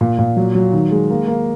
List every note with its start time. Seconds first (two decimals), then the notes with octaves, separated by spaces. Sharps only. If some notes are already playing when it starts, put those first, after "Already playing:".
0.01 A#2
0.19 A#2
0.37 F#3
0.55 F#3
0.73 D#3
0.91 G#3
1.10 A#3
1.28 A#3